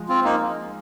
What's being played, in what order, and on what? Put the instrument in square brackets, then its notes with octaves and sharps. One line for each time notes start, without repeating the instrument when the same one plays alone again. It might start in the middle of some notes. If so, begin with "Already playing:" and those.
Already playing: [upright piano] F3 G#3
[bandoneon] C4 F4
A#3 D#4